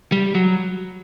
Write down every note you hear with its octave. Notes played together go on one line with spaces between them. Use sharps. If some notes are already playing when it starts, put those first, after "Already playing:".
G3
F#3